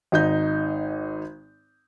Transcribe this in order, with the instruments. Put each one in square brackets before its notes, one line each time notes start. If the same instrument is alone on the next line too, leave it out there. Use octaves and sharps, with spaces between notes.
[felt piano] G#1 D#4 G6